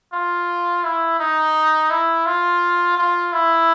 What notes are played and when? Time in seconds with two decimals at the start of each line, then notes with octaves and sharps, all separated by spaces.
0.13 F4
0.84 E4
1.20 D#4
1.90 E4
2.26 F4
2.98 F4
3.33 E4